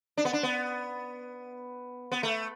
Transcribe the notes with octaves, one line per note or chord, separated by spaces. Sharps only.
D4
B3
D4
B3
B3
A3